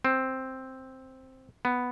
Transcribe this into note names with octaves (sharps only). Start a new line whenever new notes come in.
C4
B3